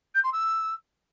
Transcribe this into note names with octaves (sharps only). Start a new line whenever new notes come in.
G6
C6
E6